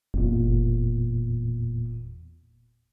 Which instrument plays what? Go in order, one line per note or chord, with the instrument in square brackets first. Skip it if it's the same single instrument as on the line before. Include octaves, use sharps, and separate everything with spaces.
[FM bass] F#1 [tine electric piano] E2 A#2